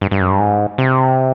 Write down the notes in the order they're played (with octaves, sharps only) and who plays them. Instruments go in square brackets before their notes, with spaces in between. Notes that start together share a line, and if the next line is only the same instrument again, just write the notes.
[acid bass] G2
G2
F#2
G2
G#2
C3